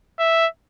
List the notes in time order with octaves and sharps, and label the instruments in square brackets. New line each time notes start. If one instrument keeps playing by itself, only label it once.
[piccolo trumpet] E5